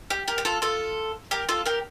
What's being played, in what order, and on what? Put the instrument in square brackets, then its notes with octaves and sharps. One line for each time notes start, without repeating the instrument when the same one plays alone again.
[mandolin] G4
G4 A#4
G4
F4 A4
F4 A4
G4 A#4
F4 A4
G4 A#4